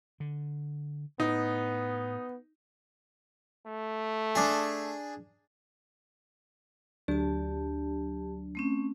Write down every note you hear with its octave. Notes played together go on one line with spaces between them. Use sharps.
D3
A2 B3 D#4
A3
D4 G#4
D2 F#3 D4 G4 A5
A3 C4 C#4